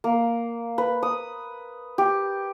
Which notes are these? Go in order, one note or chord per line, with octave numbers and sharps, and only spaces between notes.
A#3
B4
D#6
G4